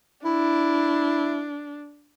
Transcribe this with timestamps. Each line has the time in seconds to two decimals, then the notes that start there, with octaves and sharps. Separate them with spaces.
0.25 D4 E4